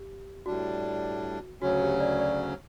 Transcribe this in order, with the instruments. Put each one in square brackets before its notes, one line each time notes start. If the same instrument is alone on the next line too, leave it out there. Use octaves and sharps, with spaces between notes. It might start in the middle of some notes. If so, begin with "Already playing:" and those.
Already playing: [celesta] G4
[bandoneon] A2 G3 D4 [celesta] F#4
[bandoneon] D2 C#3 F#3 C#4 [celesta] F#4
[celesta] G4
D5
D5